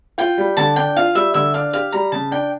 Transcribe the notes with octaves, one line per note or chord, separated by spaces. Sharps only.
F4 G5
G3
D3 A5
D4 G5
F4 F5
G3 E5
D3 E5
D4 F5
G4 F5
G3 A#5
C#3 A5
D4 G5